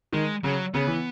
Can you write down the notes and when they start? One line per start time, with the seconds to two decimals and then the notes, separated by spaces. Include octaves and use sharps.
0.13 D#3 G#3
0.43 C#3 F#3
0.74 C#3 B3
0.87 E3